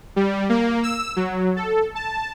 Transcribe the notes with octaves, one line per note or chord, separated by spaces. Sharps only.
G3
A#3
E6
F#3
A4
A5